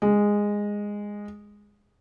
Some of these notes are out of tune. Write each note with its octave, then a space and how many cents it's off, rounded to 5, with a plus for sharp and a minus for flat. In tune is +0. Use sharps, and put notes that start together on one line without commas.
G#3 -10